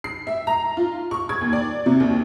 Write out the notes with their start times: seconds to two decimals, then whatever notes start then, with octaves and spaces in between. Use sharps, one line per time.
0.04 C7
0.27 E5
0.47 A#5
0.77 F4
1.11 C#6
1.29 G#6
1.41 D#2
1.53 D5
1.86 C3
2.00 D#2